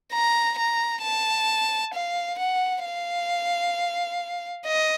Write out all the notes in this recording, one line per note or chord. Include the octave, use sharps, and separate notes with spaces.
A#5
A#5
A5
F5
F#5
F5
D#5